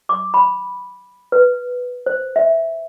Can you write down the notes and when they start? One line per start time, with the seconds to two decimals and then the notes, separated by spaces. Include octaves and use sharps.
0.09 D6
0.34 B5
1.32 B4
2.06 C5
2.36 E5